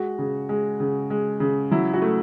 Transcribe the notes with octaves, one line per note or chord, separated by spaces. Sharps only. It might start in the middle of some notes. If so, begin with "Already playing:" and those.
Already playing: G#3 F#4
C#3
G#3
C#3
G#3
C#3
F#3 E4
F#4
A3